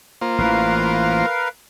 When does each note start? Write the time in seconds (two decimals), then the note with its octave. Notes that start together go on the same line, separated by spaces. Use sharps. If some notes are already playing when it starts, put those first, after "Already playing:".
0.21 A#3 F4 C5
0.38 A1 E3 A#4 B4 F5